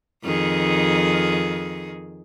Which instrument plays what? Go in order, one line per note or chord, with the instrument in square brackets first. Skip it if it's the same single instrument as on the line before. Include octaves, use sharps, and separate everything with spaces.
[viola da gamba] F2 D#3 G#4